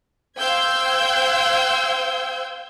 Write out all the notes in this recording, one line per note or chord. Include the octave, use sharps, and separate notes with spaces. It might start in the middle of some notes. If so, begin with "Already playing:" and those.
C5 F5 G5 E6 G6 G#6